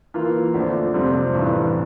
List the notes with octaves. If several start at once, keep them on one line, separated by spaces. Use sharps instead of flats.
E3 A#3 F4
D2 D3 F3 C4
F2 C3 G3 C4
A1 G2 E3